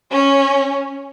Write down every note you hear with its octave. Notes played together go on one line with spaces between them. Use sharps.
C#4